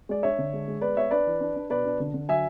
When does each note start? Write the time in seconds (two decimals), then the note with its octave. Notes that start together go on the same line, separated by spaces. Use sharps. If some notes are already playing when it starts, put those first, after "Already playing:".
0.09 G#3 D5
0.23 D4 C#5 E5
0.39 D3
0.53 G#3
0.68 G#3
0.81 B3 B4 D5
0.96 B3 C#5 E5
1.11 D4 B4 D5
1.27 E3
1.41 D4
1.56 D4
1.69 B2 B4 D5
1.85 D4
2.00 D3
2.14 D3
2.29 F#3 E5 G#5